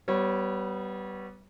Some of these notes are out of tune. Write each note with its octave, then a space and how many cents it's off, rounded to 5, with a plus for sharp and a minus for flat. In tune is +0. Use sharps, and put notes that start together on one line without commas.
G3 -25 B3 +0 C#5 -25